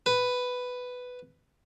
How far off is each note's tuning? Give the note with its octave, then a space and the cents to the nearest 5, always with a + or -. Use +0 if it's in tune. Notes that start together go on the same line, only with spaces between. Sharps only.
B4 +5